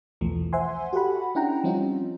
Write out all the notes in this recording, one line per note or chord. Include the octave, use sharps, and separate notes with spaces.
B1 E2 E3 F3 A3
C5 E5 F#5 G#5 C6
F#4 G4 A4 F#5 B5
C#4 D4 E4 F#5 G5 A#5
F3 G3 C4 C#4 D#4 F4